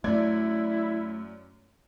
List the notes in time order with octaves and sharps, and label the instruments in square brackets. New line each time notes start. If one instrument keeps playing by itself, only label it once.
[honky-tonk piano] F#2 D5 G#6 [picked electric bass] A3 [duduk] E4